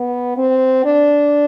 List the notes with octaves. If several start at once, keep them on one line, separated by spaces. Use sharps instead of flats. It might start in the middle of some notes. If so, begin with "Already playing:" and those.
Already playing: B3
C4
D4